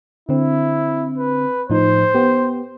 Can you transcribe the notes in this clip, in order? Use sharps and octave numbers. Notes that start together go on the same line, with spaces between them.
D3 C4 E4
B4
A2 F3 D#4 C5
B3 G4